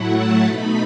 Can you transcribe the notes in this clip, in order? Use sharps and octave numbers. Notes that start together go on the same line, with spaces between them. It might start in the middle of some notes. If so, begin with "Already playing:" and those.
Already playing: A2 F#3 A3 E4 F#5
A5
B2 A3 D#4 B5